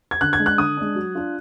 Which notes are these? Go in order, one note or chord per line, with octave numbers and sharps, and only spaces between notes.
G#6
D3 F#6
G#6
G#3 D4
F#6
D3 D#6
G#3 D4
F#3
D4 F4